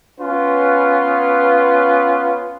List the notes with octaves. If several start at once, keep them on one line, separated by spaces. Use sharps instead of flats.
B3 C#4 F4 B4